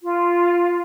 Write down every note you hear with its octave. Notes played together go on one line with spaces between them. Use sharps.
F4